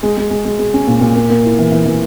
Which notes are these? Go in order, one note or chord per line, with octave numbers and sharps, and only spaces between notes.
G#3
G#3
G#3
G#3
G#3
C#4
A#2
A#2
A#3
A#3
E4
E3
E3
E3